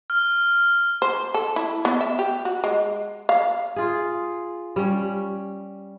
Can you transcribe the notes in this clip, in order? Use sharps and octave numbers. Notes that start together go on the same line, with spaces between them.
F6
C5
A4
E4
B3
E5
G4
F#4
G#3
F5
F4 G#4
G3 C#4